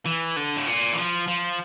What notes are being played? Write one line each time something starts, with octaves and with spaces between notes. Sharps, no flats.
E3
D3
A2
A#2
E3
F3
F3